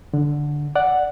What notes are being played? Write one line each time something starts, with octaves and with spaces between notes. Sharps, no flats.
D3
D5 F#5